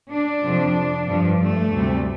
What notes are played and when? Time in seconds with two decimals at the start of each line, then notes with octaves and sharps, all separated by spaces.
0.10 D4
0.43 F2 C3 F3
1.07 G2 F3
1.40 A3
1.73 D2 C3 G3